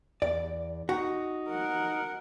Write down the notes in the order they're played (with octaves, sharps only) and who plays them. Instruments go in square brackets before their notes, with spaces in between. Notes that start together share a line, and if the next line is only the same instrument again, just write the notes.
[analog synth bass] E2 [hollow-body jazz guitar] D5
[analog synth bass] D#4 [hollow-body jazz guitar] F#4
[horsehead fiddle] A#4 F#5